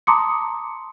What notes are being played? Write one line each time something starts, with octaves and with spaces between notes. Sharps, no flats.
A5 A#5 C6 D6 D#6 C#7